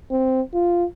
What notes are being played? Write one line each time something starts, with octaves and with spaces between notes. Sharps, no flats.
C4
F4